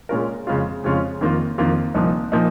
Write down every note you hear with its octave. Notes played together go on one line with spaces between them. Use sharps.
A#2 G#3 C#4 F4 A#4
F2 C#3 G#3 C#4 F4
F2 C#3 G#3 C#4 F4
F2 D#3 A#3 F4
F2 D#3 A#3 F4
C2 A#2 F3 A#3 D#4
A#2 F3 A#3 D#4